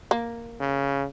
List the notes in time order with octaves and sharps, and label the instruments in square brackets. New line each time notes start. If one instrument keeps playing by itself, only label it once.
[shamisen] A#3
[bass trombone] C#3